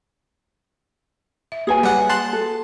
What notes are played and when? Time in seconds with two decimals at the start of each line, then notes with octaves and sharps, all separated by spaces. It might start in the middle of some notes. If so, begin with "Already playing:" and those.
1.52 E5
1.67 A#3 G#4 B4 C#5 G#5
1.83 G3 F#5
2.09 A5 C6 F#6
2.33 A4